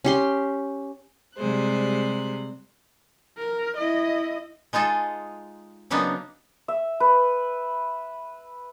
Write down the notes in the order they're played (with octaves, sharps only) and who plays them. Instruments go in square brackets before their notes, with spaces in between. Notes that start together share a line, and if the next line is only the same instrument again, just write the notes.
[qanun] C#4 G4 C6
[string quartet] C3 G3 G#3 C5 F#6
[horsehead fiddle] A#4
E4 D#5
[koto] G#3 D#4 F4 G#4 A4
C#3 F#3 A#3 B3 D4 D#4
[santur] E5
B4